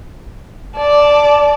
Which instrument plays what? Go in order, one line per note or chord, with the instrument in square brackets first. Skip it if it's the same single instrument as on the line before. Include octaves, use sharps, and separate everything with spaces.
[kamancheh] D5 A5